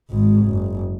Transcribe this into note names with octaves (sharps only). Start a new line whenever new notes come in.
G#1 G#2
F#1